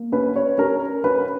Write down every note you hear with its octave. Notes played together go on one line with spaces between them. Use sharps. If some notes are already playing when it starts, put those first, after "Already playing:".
Already playing: A#3
C#4 B4
C#5
C#4 A#4
C#4 B4